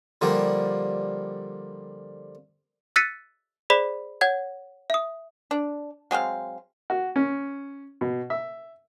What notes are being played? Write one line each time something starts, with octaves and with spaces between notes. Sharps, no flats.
D3 F3 G3 A#3
E6 F#6 A6 B6 C#7 D#7
G#4 C5 D5 B5 B6
C#5 F#5 G#6
E5 D#6
D4
F#3 G#3 C4 F5
F#4
C#4
B2
E5